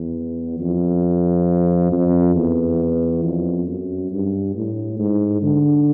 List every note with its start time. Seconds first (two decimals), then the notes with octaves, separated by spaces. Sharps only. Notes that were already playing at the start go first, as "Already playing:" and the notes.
Already playing: E2
0.60 F2
1.92 F2
2.35 E2
3.24 F2
3.67 F#2
4.12 G2
4.55 A2
4.99 G#2
5.42 D3